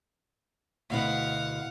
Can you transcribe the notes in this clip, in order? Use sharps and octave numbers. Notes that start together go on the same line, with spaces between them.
D2 B2 E4 F5 F#5